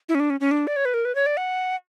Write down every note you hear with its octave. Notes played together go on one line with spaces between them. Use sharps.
E4
C#4
D4
C#4
C#4
D4
D5
C#5
B4
A#4
B4
C#5
D5
F#5